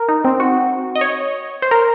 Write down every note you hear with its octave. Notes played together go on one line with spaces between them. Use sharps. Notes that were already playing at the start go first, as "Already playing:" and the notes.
Already playing: A#4
D#4
C4
F#4
D#5
C#5
C5
A#4